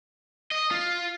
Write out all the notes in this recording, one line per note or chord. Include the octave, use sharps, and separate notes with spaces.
D#5
F4